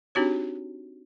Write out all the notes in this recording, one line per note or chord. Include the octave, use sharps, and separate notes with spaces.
C4 D4 D#4 F#4 G4 C#5